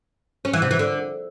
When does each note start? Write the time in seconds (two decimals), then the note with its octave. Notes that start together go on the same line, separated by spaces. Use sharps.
0.45 C#4
0.53 E3
0.62 C3
0.71 E3
0.79 D3